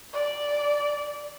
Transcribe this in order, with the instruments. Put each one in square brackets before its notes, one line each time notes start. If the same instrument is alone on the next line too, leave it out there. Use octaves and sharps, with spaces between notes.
[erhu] D5